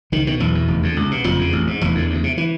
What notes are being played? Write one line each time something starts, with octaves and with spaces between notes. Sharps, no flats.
C#2 D#3
B2 D#3
B1 E2 E3
B2
F1
F2 D3
C#2
B2
F#1 F2 F3
E2 C#3
A1
G#2
F1 E2 E3
F2 D3
D2
C3
E3